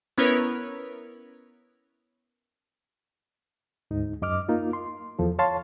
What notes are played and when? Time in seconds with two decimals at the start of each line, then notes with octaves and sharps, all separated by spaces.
0.18 B3 C#4 E4 A#4 B4 C#5
3.91 D2 G#2 D#4
4.22 F#2 D#5 D6 F6
4.49 A#3 D#4 F4
4.73 C6
5.19 E2 F3 A4
5.39 C#5 F5 A5 C6